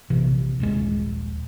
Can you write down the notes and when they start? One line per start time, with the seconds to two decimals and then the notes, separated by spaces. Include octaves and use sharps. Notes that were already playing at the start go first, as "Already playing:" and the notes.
0.10 A#1 C3 E3
0.60 D#1 A#1 G#3